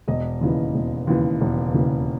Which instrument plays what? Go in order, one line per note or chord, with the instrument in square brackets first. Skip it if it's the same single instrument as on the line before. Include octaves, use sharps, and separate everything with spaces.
[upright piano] E1 D#5
D#2 C#3 E3
E1
D#2 C#3 E3
E1
D#2 C#3 E3